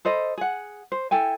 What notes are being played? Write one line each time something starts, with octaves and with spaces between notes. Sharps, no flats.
A4 C5 D#5 B5
G#4 F#5
C5
E4 A4 G5 G#5